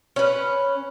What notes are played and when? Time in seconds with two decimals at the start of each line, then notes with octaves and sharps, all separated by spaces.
0.16 C#4 B4